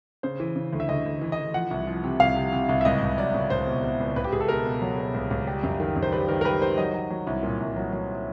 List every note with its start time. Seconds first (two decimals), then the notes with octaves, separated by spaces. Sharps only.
0.23 C#3 C5
0.40 E3
0.56 C#3
0.73 D2
0.80 E5
0.89 D2 D#5
1.06 D2
1.21 E3
1.32 D#5
1.38 E3
1.54 F3 F#5
1.71 C2
1.87 F3
2.04 C3
2.20 C2 F5
2.36 C3
2.52 C3
2.69 C2
2.81 E5
2.85 C#2 D#5
3.02 C#2
3.18 F#3 D5
3.34 C#2
3.50 C#2 C5
3.67 B2
3.84 B2
4.00 C#2
4.16 C#2 B4
4.24 G4
4.32 C#2 G#4
4.40 A4
4.48 B2 A#4
4.66 B2
4.82 F#3
4.98 B2
5.14 C#2
5.30 C#2
5.47 G3
5.63 F#2
5.80 D#3
5.96 F#2
6.03 C5
6.12 G3 B4
6.28 D#3 A#4
6.41 A#4
6.45 G3 B4
6.61 D#3 C5
6.78 F#3 D#5
6.94 F#3
7.10 F#3
7.27 C2
7.43 A#2
7.60 C2
7.76 F#3
7.93 F#3